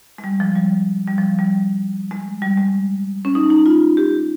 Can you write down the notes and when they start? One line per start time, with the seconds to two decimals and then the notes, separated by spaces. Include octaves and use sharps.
0.18 G#3
0.24 G3
0.40 F3
0.55 G3
1.08 G3
1.18 F3
1.39 G3
2.11 G#3
2.42 G3
2.57 G#3
3.25 C#4
3.35 D#4
3.50 D#4
3.66 F4
3.97 G4